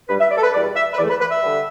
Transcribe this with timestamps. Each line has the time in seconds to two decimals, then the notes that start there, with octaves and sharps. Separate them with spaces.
0.08 G2 G3 B4
0.20 E5
0.31 D5
0.37 A4
0.43 B4
0.53 E2 B2 G3 D5
0.75 E5
0.94 B4
0.98 E2 E3 A3 D5
1.09 B4
1.20 B4
1.31 E5
1.42 D3 G3